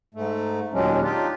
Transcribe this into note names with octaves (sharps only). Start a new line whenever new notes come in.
G#2 A3
D#2 A#2 F#3 G#3 C#4 D4
D4 D#4 F4 G4